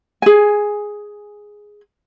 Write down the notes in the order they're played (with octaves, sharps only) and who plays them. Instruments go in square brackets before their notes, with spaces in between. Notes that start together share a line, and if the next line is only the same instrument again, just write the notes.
[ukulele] G#4 G#5